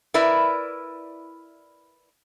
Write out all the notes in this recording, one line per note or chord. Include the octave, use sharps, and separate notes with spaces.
E4 A#4 B4 D5 E5